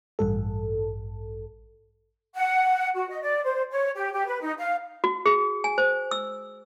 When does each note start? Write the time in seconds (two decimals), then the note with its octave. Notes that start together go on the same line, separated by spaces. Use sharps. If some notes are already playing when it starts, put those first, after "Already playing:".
0.19 A1 G2 A4
2.35 F#5
2.94 F#4
3.08 D#5
3.21 D5
3.44 C5
3.71 C#5
3.95 G4
4.12 G4
4.26 B4
4.41 D#4
4.57 F5
5.04 F#4
5.26 G#4
5.64 G#5
5.78 C5
6.11 E6